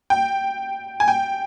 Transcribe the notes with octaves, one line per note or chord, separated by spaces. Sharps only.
G5
G#5
G5